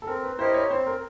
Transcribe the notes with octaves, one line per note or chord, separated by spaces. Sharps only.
A4
C4 A#4
B4
E4 G4 A#4 C5 D#5
C#5
C4 C5
A#4